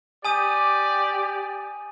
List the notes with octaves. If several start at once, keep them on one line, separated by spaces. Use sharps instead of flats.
G4 D5 G#5 D#6 D#7